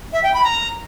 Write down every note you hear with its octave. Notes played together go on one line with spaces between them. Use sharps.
E5
G5
B5
A#5